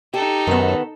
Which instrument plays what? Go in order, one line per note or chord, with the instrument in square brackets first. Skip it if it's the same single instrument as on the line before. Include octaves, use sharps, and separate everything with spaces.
[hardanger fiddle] D#4 A4 [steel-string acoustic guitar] G4
[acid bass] F#2 [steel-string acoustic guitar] D#3 B3